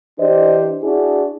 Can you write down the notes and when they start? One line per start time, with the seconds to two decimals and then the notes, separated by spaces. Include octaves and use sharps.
0.18 E3 D4 G4 C5 D5 D#5
0.83 D4 E4 F#4 G#4